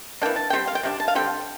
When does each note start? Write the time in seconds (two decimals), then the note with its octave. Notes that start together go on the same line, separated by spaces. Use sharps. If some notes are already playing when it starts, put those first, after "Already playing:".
0.22 E3 A#3 D4 G5
0.36 A5
0.50 D3 G3 C4 G5
0.67 F5
0.75 G5
0.83 C3 G3 D4
1.00 A5
1.08 F5
1.15 D3 G3 C4 G5